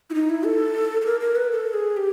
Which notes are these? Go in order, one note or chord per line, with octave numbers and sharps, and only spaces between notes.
E4
D#4
E4
A4
A4
A#4
A#4
B4
A4
G#4
G4